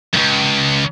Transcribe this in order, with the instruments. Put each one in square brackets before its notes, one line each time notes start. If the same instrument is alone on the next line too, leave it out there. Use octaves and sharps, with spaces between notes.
[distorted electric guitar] C#2 F#2